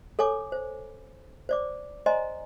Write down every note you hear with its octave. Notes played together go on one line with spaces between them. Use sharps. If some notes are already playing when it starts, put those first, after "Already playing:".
A4 C#5 G#5 D6
C5
C5 D5 D6
C5 D5 D#5 G#5 A#5 C6